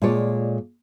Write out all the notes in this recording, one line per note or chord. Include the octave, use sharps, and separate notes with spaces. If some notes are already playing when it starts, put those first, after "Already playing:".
A#2 G#3 F4 A4 C#5 D5